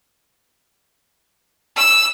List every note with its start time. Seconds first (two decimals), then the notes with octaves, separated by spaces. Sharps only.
1.76 E6